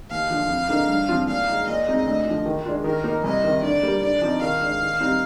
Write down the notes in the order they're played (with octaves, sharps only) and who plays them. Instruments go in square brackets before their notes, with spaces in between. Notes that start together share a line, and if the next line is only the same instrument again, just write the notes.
[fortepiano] D#2 [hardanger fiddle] F5
[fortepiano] D3 F3
F2
D3 G#3 D#4 A#4
G2
F3 C4 F4
[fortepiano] A#2 [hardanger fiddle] F5
[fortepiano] G#3 D#4
[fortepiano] A#2 [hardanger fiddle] D#5
[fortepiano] G#3 C4 D#4
D2
D3 F3
D#3
G#3 D4 F4
[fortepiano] D#3 [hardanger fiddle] A#4
[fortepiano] A#3 D#4
[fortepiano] C2 [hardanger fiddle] D#5
[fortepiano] C3 D#3
[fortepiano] D3 [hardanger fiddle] D5
[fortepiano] G3 A#3
[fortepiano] D3 [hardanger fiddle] D5
[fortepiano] F3 C4 D#4
[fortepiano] D#3 [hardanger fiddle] F5
[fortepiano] G#3 D4
D#3
G3 C4 D#4